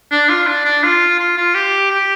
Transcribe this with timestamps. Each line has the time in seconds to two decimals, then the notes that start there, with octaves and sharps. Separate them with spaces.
0.12 D4
0.30 F4
0.47 D4
0.65 D4
0.84 F4
1.20 F4
1.38 F4
1.55 G4
1.91 G4